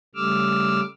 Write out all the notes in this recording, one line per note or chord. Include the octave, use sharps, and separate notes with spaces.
C#3 G3 A3 D6 E6 F6